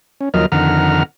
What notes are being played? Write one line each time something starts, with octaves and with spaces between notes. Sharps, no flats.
C#4
D#2 F3 F#3 A#4 D#5 F6
F2 D3 D#3 F#5 A#5 F6